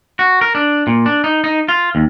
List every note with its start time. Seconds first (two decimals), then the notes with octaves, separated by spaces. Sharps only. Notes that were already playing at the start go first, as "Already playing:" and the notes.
0.19 F#4
0.41 A#4
0.55 D4
0.87 A#2
1.06 D4
1.24 D#4
1.44 D#4
1.69 F4
1.95 D#2